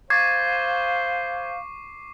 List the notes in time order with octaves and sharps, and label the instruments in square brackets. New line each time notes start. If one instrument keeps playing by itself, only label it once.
[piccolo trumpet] C5 [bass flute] F5 [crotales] C#6 D6 C7 [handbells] G#6 A6